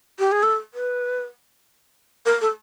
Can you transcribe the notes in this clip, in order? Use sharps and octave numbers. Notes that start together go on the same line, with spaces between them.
G4
G#4
A4
B4
A#4
A4